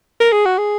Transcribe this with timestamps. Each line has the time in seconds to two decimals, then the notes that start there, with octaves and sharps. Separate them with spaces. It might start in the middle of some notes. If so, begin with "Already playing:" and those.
0.20 A#4
0.32 G#4
0.46 F#4
0.58 G#4